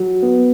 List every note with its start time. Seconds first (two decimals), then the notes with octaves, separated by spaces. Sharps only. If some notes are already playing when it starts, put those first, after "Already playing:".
Already playing: F#3
0.22 B3